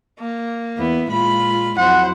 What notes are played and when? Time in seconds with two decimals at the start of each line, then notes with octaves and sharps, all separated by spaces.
0.19 A#3
0.78 E2 B3 E4
1.11 A#2 G#3 F4 B5
1.78 F2 F#3 E4 C5 F#5